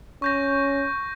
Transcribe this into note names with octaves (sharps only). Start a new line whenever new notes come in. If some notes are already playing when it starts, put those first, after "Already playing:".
C#4 C#6 G6 A#6